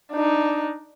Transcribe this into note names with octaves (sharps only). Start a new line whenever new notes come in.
D4 D#4